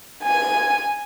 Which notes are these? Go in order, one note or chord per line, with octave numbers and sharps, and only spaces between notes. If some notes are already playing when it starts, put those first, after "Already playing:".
G#5